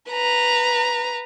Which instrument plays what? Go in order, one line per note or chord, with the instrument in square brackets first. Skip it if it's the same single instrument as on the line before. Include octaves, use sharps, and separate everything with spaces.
[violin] B4 A#5